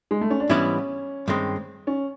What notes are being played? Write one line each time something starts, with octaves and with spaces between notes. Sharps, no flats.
G#3
A3
C#4
D4
G#2 E3 G3 B3 C#4 E4
G2 D#3 G#3 C4
C#4